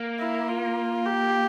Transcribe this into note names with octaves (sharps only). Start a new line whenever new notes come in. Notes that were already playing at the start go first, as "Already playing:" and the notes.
Already playing: A#3
E4
F4
G4